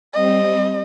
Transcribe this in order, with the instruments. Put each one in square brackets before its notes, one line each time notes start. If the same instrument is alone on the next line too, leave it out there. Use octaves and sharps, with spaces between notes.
[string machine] G3 C4 [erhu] D#5